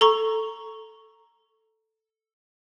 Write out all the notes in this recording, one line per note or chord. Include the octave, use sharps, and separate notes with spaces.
A4 A#5 C#6